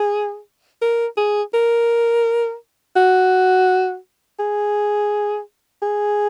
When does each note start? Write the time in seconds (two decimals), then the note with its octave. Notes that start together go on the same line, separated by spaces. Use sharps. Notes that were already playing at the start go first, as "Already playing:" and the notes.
Already playing: G#4
0.82 A#4
1.17 G#4
1.54 A#4
2.96 F#4
4.39 G#4
5.82 G#4